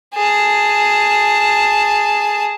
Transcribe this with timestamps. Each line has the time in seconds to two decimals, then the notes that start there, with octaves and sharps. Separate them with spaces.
0.15 G#4 A5